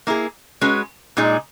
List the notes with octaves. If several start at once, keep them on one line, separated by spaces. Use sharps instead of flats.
A#3 E4 G#4
G#3 C#4 F#4 B4
A#2 G#3 D#4 G#4